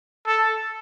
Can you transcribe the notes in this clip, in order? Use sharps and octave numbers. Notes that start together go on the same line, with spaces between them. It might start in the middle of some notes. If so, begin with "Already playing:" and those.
A4